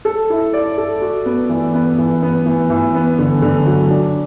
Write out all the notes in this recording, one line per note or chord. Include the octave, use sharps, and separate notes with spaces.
A4
E4
D5
A4
F#4
B3
E3
B3
E3
B3
E3
E3
B3
D3
D3
F#3
D4